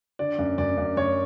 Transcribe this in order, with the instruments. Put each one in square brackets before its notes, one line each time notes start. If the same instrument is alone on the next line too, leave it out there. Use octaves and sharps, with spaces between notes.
[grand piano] D3 D5
F#2
F#2 D5
F#2
F#2 C#5